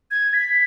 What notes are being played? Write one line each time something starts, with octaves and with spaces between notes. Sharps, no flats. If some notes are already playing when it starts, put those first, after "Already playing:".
G#6
B6